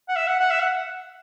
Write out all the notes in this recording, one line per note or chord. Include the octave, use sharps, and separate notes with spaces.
F#5
E5
F#5
F#5
E5
F#5